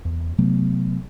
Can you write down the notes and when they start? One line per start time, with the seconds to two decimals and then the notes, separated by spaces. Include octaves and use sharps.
0.05 E2
0.38 C3 F#3 A3 B3